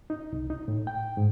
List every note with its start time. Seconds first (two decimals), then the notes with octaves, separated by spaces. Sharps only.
0.10 D#4
0.33 C2
0.50 D#4
0.68 A2
0.87 G5
1.17 G#2